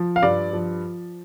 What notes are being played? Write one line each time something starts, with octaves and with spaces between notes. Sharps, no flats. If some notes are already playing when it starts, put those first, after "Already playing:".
Already playing: F3
F5
G2 D5
F3